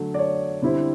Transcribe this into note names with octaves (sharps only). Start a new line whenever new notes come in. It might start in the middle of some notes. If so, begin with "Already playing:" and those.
Already playing: D3 F#3 A3
D5
C#5
D3 G3 C4 E4